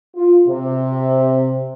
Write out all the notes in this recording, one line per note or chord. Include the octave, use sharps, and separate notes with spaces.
F4
C3